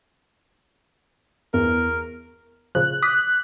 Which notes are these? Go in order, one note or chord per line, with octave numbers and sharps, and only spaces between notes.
E2 A#4
A#2 C#3 F3 F#6
D6 D#6 F#6 B6